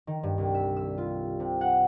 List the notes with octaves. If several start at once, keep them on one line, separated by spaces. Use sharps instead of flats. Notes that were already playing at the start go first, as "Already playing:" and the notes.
D#3
G2
C2
E5
E6
F4
C3
F#5